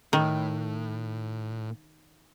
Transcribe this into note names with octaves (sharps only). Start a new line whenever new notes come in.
A2 D#3